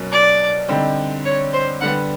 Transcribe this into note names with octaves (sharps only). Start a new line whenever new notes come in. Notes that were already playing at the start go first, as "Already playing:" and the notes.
Already playing: B2 F#3 A#3 C#4 F#4
D5
D3 G3 C4 D#4
C#5
C5
D3 G3 B3 F#5